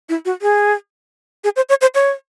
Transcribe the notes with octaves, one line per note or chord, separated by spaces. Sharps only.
E4
F#4
G#4
G#4
C5
C#5
C5
C#5